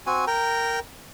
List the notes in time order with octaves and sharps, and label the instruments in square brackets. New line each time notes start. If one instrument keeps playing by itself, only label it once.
[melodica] C4 F#4 G#5
A#4 G5 A#5